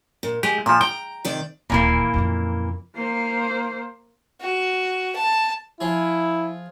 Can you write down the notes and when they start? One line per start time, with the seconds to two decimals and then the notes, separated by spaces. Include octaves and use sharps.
0.23 A#2
0.43 G#3 G4
0.66 A#2 F3 E5
0.81 G5 A#5
1.25 C3 D#3 D5
1.70 D1 D#2 A#2 E3 A#3
2.14 F2 C#3
2.95 A#3 C5
4.41 F#4
5.16 A5
5.81 F3 E4 G#4